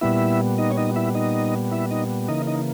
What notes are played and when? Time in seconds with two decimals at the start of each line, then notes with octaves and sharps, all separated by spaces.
0.01 A#2 G3 B3 E4 E5
0.58 D#4 D#5
0.70 C#5
0.77 D#4 D#5
0.96 E4 E5
1.15 D#4 D#5
1.72 E4 E5
1.91 D#4 D#5
2.28 C#3 E3 A#3 D#4 D#5
2.47 D#4 D#5